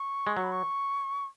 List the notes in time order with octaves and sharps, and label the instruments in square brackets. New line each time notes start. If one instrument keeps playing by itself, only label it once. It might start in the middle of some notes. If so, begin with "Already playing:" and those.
Already playing: [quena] C#6
[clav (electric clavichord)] G#3
[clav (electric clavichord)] F#3 [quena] C#6
[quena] B5
C#6